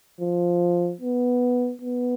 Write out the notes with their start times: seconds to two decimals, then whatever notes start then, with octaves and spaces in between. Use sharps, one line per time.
0.21 F3
1.01 B3
1.82 B3